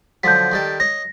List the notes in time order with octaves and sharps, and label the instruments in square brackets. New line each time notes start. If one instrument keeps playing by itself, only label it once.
[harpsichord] D3 F3 F#3 [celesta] G6 B6
[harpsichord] D#3 G3 A4
[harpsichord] C#5 D#5 [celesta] A#6